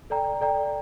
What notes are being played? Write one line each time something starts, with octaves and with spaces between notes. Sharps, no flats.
A4 D5 G5 A#5
A4 D5 G5 A#5